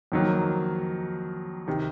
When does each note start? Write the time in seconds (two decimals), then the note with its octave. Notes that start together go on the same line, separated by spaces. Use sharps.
0.12 F2 D#3 F#3 A#3
1.68 C3 D#3